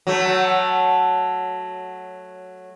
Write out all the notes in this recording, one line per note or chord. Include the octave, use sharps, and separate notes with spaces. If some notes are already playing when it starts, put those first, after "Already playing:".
F#3 A3